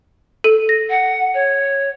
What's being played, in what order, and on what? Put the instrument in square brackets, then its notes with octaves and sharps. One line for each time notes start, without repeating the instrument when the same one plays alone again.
[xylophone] A4 D#7
A#6
[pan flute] F#5
C#5